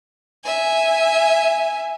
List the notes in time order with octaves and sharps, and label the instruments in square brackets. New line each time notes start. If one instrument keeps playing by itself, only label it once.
[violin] E5 G#5